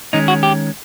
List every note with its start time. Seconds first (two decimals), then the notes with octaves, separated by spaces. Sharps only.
0.13 D#3 G#3 C#4 D#4
0.28 F#4
0.43 G4